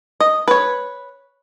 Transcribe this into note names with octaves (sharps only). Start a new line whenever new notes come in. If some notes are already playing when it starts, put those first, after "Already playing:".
D#5
B4 C#5